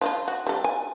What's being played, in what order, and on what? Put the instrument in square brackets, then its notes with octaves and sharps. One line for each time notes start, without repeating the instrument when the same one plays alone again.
[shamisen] F3 E4 F4
F#4
G3 A4
G#5